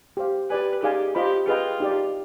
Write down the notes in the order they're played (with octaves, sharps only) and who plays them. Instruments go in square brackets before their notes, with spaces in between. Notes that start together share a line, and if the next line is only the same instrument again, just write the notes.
[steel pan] G4 C5 F5
[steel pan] G4 D5 G#5 [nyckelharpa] B4
[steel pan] D#4 G#4 D5 F5 G#5 [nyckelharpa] G4
[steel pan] F4 C5 D#5 B5 [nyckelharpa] G4
[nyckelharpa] F4 [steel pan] G#4 B4 D#5 G5
[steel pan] D#4 G4 D5